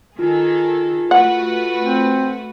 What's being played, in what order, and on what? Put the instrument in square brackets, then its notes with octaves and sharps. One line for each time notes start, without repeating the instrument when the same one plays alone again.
[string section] D#3 G#4 A4 [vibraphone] F4
[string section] A3 F#4 B4 [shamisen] F#5
[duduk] C4